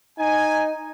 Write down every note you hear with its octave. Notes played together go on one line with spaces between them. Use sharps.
D#4 G#5